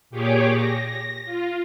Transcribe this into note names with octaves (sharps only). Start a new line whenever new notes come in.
A#2 G4 G#4 C#5 D6
A#6
F4